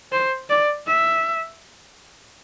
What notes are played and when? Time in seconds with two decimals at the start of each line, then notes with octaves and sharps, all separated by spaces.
0.12 C5
0.50 D5
0.87 E5